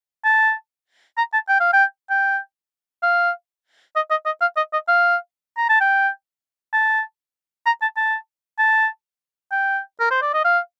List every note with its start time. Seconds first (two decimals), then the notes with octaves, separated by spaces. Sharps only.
0.25 A5
1.17 A#5
1.33 A5
1.49 G5
1.60 F5
1.73 G5
2.10 G5
3.03 F5
3.96 D#5
4.10 D#5
4.26 D#5
4.41 F5
4.57 D#5
4.73 D#5
4.88 F5
5.57 A#5
5.69 A5
5.81 G5
6.73 A5
7.66 A#5
7.82 A5
7.96 A5
8.59 A5
9.52 G5
10.00 A#4
10.11 C5
10.22 D5
10.34 D#5
10.45 F5